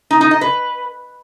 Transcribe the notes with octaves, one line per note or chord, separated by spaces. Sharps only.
D#4
D#4
D#5
B4